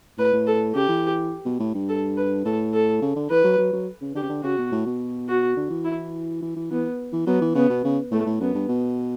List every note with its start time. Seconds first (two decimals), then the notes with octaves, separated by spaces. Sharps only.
0.18 A2 B4
0.33 A2
0.47 A4
0.75 C#3 G4
0.88 E3
1.45 B2
1.59 A2
1.74 G2
1.89 A4
2.17 B4
2.45 A2 A4
2.74 A4
3.02 C#3
3.16 D3
3.29 E3 B4
3.44 F#3
3.58 F#3
3.73 F#3
4.01 C#3
4.15 D3 G4
4.23 C#3
4.29 D3
4.43 C#3 F#4
4.58 B2
4.72 A2
4.86 B2
5.28 F#4
5.57 D3
5.70 E3
5.85 E4
6.42 E3
6.56 E3
6.71 E3 B3
7.13 E3
7.27 F#3 B3
7.41 E3
7.55 C#3 B3
7.69 B2
7.84 C#3
8.11 A2 A3
8.26 A2
8.41 F#2 B3
8.55 G2
8.69 B2